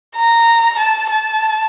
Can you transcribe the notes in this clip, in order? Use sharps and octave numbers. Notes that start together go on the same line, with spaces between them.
A#5
A5
A5